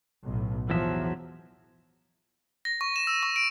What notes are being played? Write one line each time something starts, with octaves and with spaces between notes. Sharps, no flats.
B1 A2
E2 F3 F#3 E5
A#6
C#6
E7
E6
C#6
D7